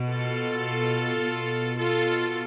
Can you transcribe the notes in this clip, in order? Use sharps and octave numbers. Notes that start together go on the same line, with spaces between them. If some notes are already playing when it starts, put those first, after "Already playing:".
Already playing: B2
F4 A4
B2
F4 A4